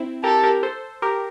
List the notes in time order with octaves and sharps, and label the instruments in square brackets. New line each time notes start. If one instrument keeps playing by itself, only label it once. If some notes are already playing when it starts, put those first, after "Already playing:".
Already playing: [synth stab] C4 E4
[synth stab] G4 A#4 [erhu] A4
[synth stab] G4 A#4
A4 C5
G4 A#4